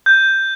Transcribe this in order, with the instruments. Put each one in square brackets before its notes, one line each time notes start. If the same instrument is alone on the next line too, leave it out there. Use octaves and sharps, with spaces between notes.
[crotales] G6